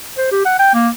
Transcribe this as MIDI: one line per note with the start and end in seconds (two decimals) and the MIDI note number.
0.18 0.27 72
0.32 0.45 67
0.45 0.58 78
0.59 0.73 79
0.74 0.89 58